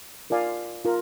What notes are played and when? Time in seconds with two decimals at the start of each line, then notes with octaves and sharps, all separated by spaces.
0.30 F4 A#4 D5 F5 G#5
0.85 F4 A#4